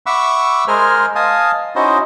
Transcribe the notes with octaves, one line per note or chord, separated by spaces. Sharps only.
E5 F#5 B5 C#6 D6 E6
G#3 G#4 A#4 C5 G#5 F6
D#5 F5 G#5 A5 D#6
C#4 D#4 E4 F#4 C5 D#5